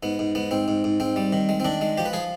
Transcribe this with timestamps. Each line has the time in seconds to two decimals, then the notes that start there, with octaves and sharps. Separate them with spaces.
0.03 G#2 B3
0.19 G#2
0.35 G#2 B3
0.51 G#2 C4
0.68 G#2
0.84 G#2
1.00 G#2 C4
1.16 G3
1.33 D#3
1.49 G#3
1.60 C4
1.65 D#3 D4
1.81 G#3
1.98 F3 G4
2.05 B4
2.13 F3 G#4